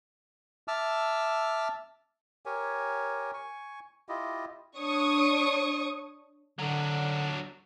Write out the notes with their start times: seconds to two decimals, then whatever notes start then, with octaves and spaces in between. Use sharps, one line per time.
0.68 E5 A5 D6 E6 F6
2.46 G4 A#4 C#5 G#5
3.34 G#5 C#6
4.09 E4 F4 G4 D#5
4.78 D4 C#5 C#6 D#6
6.59 D3 F#3 D4